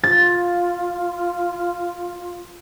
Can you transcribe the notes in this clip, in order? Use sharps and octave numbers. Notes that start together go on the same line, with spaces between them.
F4 A6